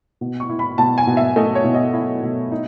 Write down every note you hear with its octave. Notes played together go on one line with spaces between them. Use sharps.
B2
C#6
E4
B5
B2 A5
G#5
B2
E5
A3 D#5
C#5
B2
D#5
E4 E5
B2
D#4